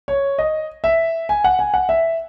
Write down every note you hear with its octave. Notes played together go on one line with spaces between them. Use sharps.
C#5
D#5
E5
G#5
F#5
G#5
F#5
E5